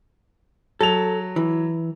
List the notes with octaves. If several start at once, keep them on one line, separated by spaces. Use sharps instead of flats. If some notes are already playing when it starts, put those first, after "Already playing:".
F#3 A4 F7
E3